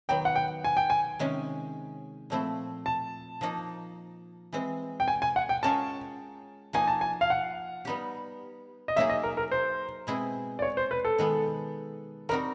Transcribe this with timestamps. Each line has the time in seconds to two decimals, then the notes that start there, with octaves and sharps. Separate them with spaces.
0.09 D#3 F#3 B3 G5
0.25 F#5
0.36 G5
0.64 G#5
0.77 G5
0.90 G#5
1.19 C3 D#3 G#3 C#4
2.30 A#2 F3 A3 C4 E4
2.86 A5
3.41 F3 A#3 D#4
4.53 E3 G#3 C4
5.00 G5
5.08 G#5
5.22 G#5
5.36 F#5
5.49 G5
5.63 G#3 C#4 F4 A#4 C#5 A5
6.73 F3 A#3 D#4 G#5
6.88 A5
7.01 G#5
7.21 F5
7.30 F#5
7.85 G3 B3 D#4 G4
8.88 D#5
8.96 F#3 A#3 D#4 G#4 E5
9.09 D#5
9.23 A#4
9.37 A#4
9.52 C5
10.07 B2 G#3 C4 E4 G#4
10.59 D5
10.62 C#5
10.77 C5
10.91 B4
11.05 A4
11.18 D#3 G#3 B3
12.29 G3 C4 D#4 F#4 A#4